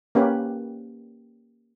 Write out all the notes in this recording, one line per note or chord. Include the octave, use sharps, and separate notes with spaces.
A#3 C#4 G4 B4